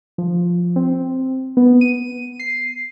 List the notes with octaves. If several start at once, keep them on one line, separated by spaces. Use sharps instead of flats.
F3
C4
B3
D#7
C7